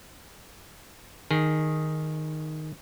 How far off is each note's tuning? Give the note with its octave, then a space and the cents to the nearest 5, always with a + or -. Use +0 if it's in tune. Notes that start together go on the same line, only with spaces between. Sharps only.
D#3 +0 G#4 +0